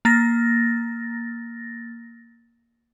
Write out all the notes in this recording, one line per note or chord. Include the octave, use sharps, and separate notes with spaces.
A#3 A6 A#6